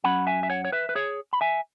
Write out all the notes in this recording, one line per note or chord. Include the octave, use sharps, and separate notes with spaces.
F#2 F#3 C#4 F#5 B5
E5 G#5
E5
C#5 F#5
C#5
B4 E5
B4
G#4 C#5
B5
E5 G#5